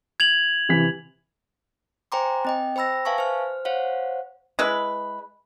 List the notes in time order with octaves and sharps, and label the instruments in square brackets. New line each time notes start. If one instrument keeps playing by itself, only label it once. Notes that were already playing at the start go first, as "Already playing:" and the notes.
[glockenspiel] G#6 F7 F#7
[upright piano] C3 E3 B6
[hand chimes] C5 G5 G#5 A#5 C6 D6
C4 D#5 G5
C5 G5 B5 E6 A#6
B4 E5 F5 G#5 A5 C#6
C5 F6
C5 C#5 F5 F#5
[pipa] G#3 E4 B4